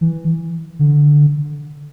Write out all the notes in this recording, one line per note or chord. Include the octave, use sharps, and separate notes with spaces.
E3
D3